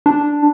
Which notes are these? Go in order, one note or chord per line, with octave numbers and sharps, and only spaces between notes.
D4